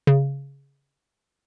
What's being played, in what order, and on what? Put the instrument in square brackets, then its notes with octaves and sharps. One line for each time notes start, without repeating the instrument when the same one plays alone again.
[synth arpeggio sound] C#3